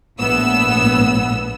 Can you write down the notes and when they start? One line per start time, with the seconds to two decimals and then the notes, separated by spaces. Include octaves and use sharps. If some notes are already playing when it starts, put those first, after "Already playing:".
0.19 A#1 A2 B3 E6